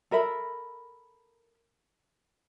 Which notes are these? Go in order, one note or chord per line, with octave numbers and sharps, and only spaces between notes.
A4 A#4 E5 B5